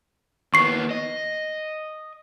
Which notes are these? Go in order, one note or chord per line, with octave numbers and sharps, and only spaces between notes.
D#2 B3 C#6 C7
D#5